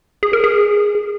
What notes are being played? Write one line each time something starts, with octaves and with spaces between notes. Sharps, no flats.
G#4
A#4
G#4